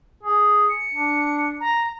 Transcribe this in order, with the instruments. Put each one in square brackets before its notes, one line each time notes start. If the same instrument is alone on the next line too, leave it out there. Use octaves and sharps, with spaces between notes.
[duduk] G#4
[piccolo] C#7
[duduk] D4
[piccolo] A#5